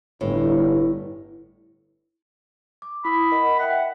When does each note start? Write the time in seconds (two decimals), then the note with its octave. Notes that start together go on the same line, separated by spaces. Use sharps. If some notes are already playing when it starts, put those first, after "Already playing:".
0.21 G1 A2
2.82 D6
3.05 E4 B5 D#6
3.32 A#4 D#5 F#5
3.59 E5 F#5 G5